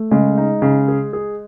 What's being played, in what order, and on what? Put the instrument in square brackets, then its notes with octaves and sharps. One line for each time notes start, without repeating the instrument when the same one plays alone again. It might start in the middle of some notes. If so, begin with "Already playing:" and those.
Already playing: [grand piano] A3
[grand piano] C#3 [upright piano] G#3
[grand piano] D#4
C#3
G#4
G#4